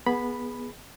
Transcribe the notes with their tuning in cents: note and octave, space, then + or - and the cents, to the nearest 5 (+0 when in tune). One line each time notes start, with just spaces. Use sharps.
B3 -20 G#4 +0 B5 +0